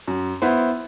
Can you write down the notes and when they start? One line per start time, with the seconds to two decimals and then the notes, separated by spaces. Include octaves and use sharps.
0.08 F#2
0.42 B3 E4 C5